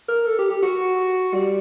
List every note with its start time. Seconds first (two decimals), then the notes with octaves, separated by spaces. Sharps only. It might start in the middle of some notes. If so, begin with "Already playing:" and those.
0.08 A#4
0.27 A4
0.39 G4
0.50 G4
0.63 F#4
1.34 G3